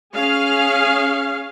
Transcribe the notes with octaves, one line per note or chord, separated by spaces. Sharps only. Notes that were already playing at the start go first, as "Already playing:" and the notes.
C#4 G#4 F5